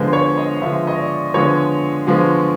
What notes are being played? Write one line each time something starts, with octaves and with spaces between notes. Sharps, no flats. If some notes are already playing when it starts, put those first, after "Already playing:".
Already playing: D3 F3 G#3 B3 C5
C#5
D#5
D3 F3 G#3 B3 E5
D#5
D5
D3 F3 G#3 B3 C#5
D3 F3 G#3 B3